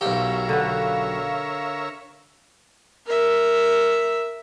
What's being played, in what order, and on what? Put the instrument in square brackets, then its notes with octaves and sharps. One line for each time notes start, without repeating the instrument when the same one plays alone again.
[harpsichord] B1 G4 [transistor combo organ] A#4 C#5 E5 [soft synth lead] F5
[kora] D3 B4
[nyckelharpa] A#4 E5